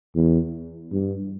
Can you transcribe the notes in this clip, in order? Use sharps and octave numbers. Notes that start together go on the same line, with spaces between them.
E2
G2